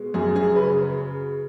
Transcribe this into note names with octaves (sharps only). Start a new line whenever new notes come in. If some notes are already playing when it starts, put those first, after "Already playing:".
Already playing: B2 G#3
F#2 G#4
G#4
C#3 B4